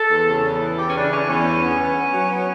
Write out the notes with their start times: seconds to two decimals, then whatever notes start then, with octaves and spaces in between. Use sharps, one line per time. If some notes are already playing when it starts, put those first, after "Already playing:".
Already playing: A4
0.10 E2
0.27 C#3
0.43 E2
0.61 E3
0.78 E3 G4
0.90 C#4
0.95 C#3 D4
1.11 E3 C#4
1.28 E2 C#4
1.46 G2
1.63 B3
1.80 B3
1.97 B3
2.13 F#3
2.30 B3